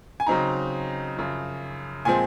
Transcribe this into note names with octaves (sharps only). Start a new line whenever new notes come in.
G#5
C#3 F#3 C4 D#4 A#5
F#2 C#3 F3
A#2 F3 G#3 C4 G#5